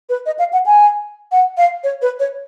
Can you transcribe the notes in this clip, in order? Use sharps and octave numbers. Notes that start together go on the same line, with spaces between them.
B4
D#5
F5
F#5
G#5
F#5
F5
C#5
B4
C#5